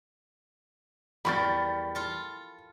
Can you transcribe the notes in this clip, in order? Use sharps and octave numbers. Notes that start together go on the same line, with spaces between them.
E2 G3 A#4 B5 C#6 A6
F4 A4